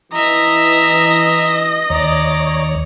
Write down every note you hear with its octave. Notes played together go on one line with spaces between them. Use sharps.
E3 D#5 E5 A#5
D#2 C#5 D5 A#5